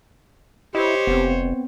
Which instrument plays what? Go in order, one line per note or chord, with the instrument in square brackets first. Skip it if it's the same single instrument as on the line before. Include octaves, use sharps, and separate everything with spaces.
[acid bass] E4 [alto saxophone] G4 [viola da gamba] C5 C#5 [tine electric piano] D#5
[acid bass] F1 [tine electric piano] B3 C4